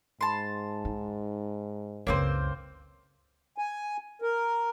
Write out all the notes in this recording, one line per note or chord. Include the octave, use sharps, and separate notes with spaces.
G#2 A5 C6
D#4
F#1 C#2 C#3 A#3 C4 C5 C#5
G#5
A#4